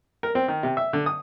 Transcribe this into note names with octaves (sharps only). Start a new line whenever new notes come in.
A#4
C4
D#3
C3
E5
D3
D#6